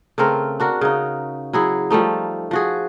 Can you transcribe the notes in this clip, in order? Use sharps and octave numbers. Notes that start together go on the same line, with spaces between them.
C#3 A3 C4 A#4
D4 F#4 A#4
C#3 D#4
F#3 E4 G#4
F3 G3 A3 D#4
F3 F#4 G#4